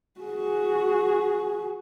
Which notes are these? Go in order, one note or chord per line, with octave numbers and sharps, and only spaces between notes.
F#4 G#4